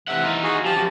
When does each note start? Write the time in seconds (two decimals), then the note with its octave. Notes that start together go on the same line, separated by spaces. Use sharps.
0.08 C3 E3 E5 F#5
0.24 D#4 F4
0.43 F#4 G#4
0.65 F3 G4 A5
0.77 F#2 G4